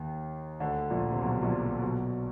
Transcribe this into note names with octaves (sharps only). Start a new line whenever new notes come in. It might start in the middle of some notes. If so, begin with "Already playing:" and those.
Already playing: D#2 D#3
D2 D3
A#1 A#2
C3
B1 B2
A#1 A#2
B1 B2